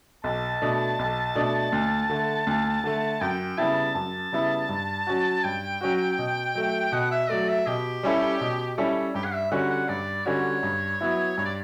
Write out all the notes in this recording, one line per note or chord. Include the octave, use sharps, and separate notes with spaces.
B1 A5
B2 A3 D4
B1
B2 A3 D4
D2
D3 A3
D2
D3 A3
F#2 G5
C#3 G3 B3 E4 A5
F#2 A5
C#3 G3 B3 E4
G2
F#3 C#4 F#4
G2 G5
F#3 C#4 F#4
B2
F#3 A3
B2 F#5
E5
F#3 A3 D5
E5
B2 G4
G3 C#4 E4 A4
B2
G3 C#4 E4 A4
G2 G4
F#5
E5
D3 G3 C#4 F#4 F#5
F#5
G2 D5
D3 G3 C#4 F#4 C#5
G2
F#3 B3 E4
G2 C#5
D5